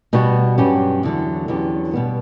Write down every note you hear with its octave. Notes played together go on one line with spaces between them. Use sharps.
B2 G3 B3 F#4
G2 F#3 C#4 G4
E2 D3 F#3
E2 D3 F#3 C#4 G4
B2 G3 B3